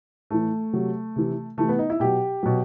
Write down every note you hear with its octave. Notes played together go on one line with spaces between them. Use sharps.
A2 E3 A3
C3 F#3
C3 E3
C3 E3 A3
B3
D#4
E4
B2 F#3 G4
B2 F#3